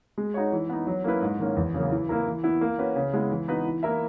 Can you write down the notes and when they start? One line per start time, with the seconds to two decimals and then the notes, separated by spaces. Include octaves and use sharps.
0.18 G#3
0.34 D#4 F#4 C#5
0.52 E3
0.70 B3 D#4
0.87 F#3
1.04 A#3 C#4 E4 B4
1.22 G#2
1.39 D#3 A#3 C#4
1.57 E2
1.74 C#3 F#3 A#3
1.92 E3
2.09 A#3 E4 A#4
2.27 E3
2.43 B3 E4
2.61 A#3
2.78 C#4 F#4 B4
2.96 C#3
3.14 G#3 B3 E4
3.31 E3
3.48 B3 D#4 F#4 B4
3.65 E3
3.83 A#3 E4 A#4 E5